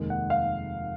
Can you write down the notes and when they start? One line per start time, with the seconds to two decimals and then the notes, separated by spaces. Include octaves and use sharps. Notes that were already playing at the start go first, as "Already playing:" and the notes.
Already playing: F1 D#2 D#3 G#3
0.10 F#5
0.30 F5